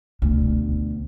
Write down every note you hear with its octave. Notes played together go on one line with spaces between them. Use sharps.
D2 B2